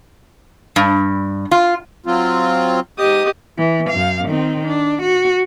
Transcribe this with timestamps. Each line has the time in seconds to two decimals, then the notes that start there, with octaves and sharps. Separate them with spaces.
0.76 G2
1.51 F4
2.06 F#3 C4 F4
2.98 G#2 G4 D#5 D#6
3.58 E3
3.89 F#2 F5
4.28 D#3 C4
4.67 D4
5.02 F#4